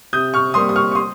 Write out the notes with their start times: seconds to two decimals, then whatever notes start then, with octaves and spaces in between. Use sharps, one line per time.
0.13 C3 D#6 G6
0.34 C#6 F6
0.54 G3 A#3 C6 D#6
0.69 D#6
0.76 C#6 F6
0.92 C#6
0.95 C6 D#6